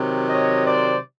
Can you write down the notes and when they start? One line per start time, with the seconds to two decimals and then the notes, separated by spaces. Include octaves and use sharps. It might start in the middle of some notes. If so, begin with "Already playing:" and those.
Already playing: C3 D#3 F#3
0.27 C#5 D#5
0.64 C5 D5